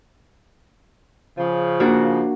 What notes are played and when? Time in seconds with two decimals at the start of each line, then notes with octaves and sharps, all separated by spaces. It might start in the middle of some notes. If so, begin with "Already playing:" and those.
1.38 C#3 F3
1.80 A#3 D4 F#4